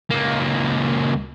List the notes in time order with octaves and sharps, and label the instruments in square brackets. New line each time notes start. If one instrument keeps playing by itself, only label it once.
[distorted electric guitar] C#2 A#3